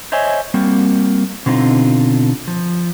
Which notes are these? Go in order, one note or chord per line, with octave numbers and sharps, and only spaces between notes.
C5 C#5 D#5 E5 G#5
G3 A#3 C4 F#4
B2 D3 C4 D#4 F4
F3